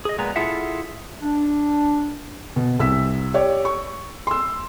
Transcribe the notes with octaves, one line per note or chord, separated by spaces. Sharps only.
G#4 D#5
A#2 G#3 B3 A#5
E4 F4 G#4 A4 E5 F#5
D4
B2
C2 E6 B6
G4 C#5 D5
C#6
C6 E6